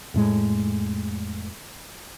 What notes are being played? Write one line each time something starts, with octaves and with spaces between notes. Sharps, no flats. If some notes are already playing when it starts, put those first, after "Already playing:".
F2 A2 G#3